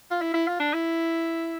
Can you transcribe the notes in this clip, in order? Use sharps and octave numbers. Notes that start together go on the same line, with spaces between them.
F4
E4
E4
F4
D4
E4